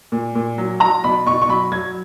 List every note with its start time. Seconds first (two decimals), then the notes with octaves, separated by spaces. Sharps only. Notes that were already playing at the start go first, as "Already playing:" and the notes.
0.12 A#2
0.35 A#2
0.58 F#3
0.80 F#3 A#5
1.04 B2 B5
1.26 B2 C#6
1.42 C#6
1.48 F#3 B5
1.72 F#3 G#6